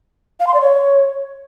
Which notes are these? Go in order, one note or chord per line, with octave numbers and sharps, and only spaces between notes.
F5
C6
D5
C#5